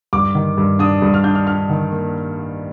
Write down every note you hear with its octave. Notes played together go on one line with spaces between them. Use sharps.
G2 D6
D#3
G2
D4 D#6
G2
F6
D4 G6
F6
D4 F6
D#3
A#3